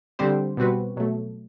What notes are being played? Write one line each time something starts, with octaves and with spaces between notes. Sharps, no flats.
D3 G3 C4 G4 C5
B2 G3 C4 F#4 B4
B2 F#3 A3